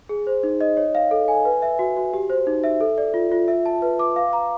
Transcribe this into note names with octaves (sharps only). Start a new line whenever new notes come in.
G#4
C5
D#4
D#5
C#5
F5
A4
G#5
B4
E5
F#4
F#4
G4
C5
D#4
E5
A4
D5
F4
F4
E5
A5
B4
D6
F5
A#5